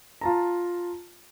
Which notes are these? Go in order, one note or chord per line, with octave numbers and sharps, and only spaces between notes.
F4 A5 A#5